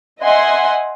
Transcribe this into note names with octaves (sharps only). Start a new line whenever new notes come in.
D#5 E5 F#5 G#5 C6